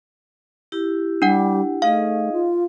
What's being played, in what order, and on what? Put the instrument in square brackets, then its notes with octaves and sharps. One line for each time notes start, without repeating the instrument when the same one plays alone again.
[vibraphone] E4 G4
[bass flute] G3 [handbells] D4 F#5
[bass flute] A3 [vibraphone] D#4 G#4 D#5 [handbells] F5
[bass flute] F4